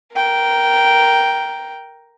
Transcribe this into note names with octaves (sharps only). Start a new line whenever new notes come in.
A#4 G5